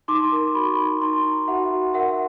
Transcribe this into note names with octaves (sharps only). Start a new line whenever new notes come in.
D#4 C6 D6
A#4
F#4 B5 C#6
D#4
D#4 A#5 C6
D#4
F#4 E5 F#5
F#4
A#4 E5 F#5